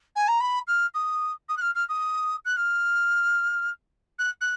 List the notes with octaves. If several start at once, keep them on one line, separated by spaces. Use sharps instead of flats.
G#5
A#5
B5
F6
D#6
D#6
F#6
F6
F6
D#6
F#6
F6
F#6
F#6